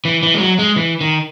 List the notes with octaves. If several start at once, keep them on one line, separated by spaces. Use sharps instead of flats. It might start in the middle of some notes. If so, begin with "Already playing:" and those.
E3
E3
G#3
F#3
G#3
E3
D#3